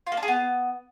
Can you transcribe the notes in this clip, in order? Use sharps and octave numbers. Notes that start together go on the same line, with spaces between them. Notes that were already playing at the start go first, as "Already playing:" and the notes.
F4
A#3
D4
G#4
B3